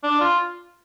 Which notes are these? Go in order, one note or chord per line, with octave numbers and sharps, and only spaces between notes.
D4
F4